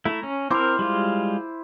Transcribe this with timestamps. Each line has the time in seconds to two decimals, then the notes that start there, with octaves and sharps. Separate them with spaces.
0.05 A3 E4 A#5
0.23 C#4
0.50 C4 E4 A#4 C5 D6
0.79 G3 G#3 F4